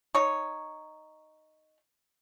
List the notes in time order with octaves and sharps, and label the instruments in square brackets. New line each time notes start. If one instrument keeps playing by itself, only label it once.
[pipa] D#4 C#5